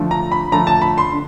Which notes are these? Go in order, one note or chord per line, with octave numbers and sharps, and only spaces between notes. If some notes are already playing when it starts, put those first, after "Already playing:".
Already playing: D3 F3 A3
A#5
B5
D3 F3 A3 A#5
A5
B5
C6
D3